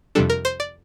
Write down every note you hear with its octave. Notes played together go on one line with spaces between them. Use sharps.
F2 C3 G3 D4 A4
A#4
C5
D5